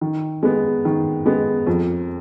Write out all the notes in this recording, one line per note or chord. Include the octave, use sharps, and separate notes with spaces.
D#3
G#3 B3
D#3
G#3 B3
F2